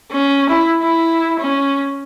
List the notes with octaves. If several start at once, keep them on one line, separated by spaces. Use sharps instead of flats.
C#4
E4
E4
C#4